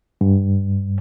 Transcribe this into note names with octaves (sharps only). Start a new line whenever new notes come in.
G2